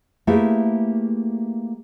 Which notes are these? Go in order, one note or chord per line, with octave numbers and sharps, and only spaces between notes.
A3 A#3 E4 G4 G#4 B4